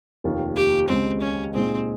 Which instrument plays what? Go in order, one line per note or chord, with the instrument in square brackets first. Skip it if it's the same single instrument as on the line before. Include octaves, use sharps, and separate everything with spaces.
[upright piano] F1 D#2 D#3 A#3 F4
[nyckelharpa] G4
[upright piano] C#2 C#3 G#3 [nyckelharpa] C4
[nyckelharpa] C#4
[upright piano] A#2 G#3 D#4 G#4 C5 [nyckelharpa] C4